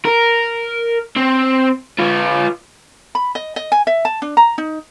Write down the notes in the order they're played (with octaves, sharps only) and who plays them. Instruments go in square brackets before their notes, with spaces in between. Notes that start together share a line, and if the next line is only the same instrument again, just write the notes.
[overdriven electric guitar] A#4
C4
F4 B4
[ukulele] B5
D#5
D#5
G#5
E5
A5
D4
A#5
D#4